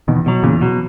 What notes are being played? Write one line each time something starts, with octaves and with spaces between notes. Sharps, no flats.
E2 B2 D#3
B2 F#3
E2 A#2 C#3
B2 F#3